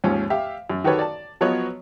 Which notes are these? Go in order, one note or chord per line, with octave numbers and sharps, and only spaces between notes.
D#2 G#2 F3 C#4
G4 E5 F5
F#2
D#3 F#4 G4 A4 B4 C#5
D5 A5
F3 F#3 B3 B4 C#5 D#5